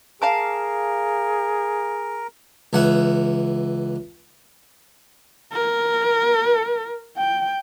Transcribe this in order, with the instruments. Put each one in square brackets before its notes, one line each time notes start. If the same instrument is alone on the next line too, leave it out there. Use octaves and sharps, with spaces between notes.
[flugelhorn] G#4 [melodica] A#4 [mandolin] F5 A5 D6
[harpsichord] C#2 E3 F#5
[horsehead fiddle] A#4
G5